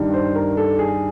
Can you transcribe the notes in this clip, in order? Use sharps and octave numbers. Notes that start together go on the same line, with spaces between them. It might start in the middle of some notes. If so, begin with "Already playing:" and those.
Already playing: G2 D#3
C5
A#4
A4
G#4